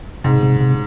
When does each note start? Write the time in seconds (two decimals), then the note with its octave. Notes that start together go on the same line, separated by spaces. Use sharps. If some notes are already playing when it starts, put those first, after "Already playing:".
0.24 G#2 C3
0.43 C3
0.61 C3